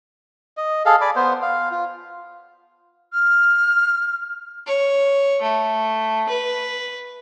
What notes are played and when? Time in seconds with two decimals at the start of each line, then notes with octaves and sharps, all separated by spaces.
0.57 D#5
0.86 G#4 A4 F5
1.01 D5 G#5 B5 D6
1.16 B3 C5
1.42 F5
1.71 F4
3.13 F6
4.67 C#5
5.42 A3
6.29 B4